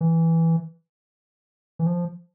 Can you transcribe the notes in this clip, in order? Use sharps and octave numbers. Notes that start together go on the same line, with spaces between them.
E3
E3
F3